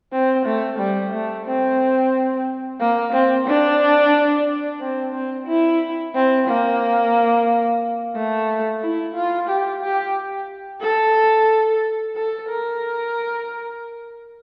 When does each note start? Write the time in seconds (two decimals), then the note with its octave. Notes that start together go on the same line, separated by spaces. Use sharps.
0.13 C4
0.46 A3
0.79 G3
1.13 A3
1.46 C4
2.80 A#3
3.13 C4
3.47 D4
4.80 C4
5.13 C4
5.47 E4
6.15 C4
6.48 A#3
8.15 A3
8.82 E4
9.15 F4
9.49 G4
9.82 G4
10.82 A4
12.16 A4
12.49 A#4